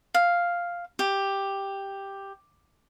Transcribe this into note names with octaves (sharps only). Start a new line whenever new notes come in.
F5
G4